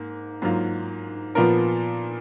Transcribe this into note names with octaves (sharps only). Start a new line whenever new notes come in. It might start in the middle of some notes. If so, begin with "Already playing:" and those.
Already playing: G#2 A#3
G#2 F#3 A#3 F4
A#2 F3 B3 F4 A#4